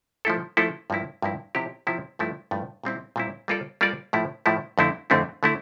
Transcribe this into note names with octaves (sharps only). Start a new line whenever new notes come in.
F3 A3 E4 A4
F3 A3 E4 A4
G2 F3 A#3 E4
G2 F3 A#3 E4
C3 F3 C4 E4 G4
C3 F3 C4 E4 G4
G2 F3 A3 E4
G2 F3 A3 E4
A#2 G3 C4 E4
A#2 G3 C4 E4
G3 A#3 F4 A4 D5
G3 A#3 F4 A4 D5
A2 F3 A3 E4
A2 F3 A3 E4
F2 D3 A3 C4 E4
F2 D3 A3 C4 E4
D3 A3 E4